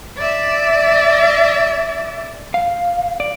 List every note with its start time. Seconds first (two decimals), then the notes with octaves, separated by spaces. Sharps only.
0.18 D5 E5
2.54 F5
3.20 D5